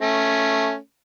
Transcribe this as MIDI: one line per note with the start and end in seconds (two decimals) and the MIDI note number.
0.01 0.77 57
0.01 0.77 61